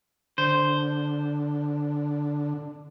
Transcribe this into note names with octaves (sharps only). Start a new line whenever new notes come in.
D3 C5